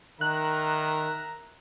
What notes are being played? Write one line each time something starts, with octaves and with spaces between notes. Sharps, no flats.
D#3 A#4 E5 A#5 F#6